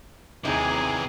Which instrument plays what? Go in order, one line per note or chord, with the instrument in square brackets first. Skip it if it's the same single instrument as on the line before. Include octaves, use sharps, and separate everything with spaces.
[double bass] D#2 [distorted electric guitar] C3 E3 [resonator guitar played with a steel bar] D#4 [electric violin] G#4 G#5